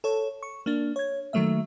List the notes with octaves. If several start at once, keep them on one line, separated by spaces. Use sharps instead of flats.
A4 C#5
C#6
A#3 D4
C#5 G#6
D#3 F#3 A3 A#3 E5